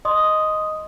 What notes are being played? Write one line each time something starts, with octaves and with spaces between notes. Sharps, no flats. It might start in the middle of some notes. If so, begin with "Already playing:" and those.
D#5 C6 D#6